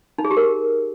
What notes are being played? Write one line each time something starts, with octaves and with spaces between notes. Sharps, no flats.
D#4
G#4
G4
A#4